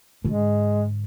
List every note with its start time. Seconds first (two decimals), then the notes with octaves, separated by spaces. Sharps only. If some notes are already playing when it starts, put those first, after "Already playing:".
0.24 G#2 D3 G#3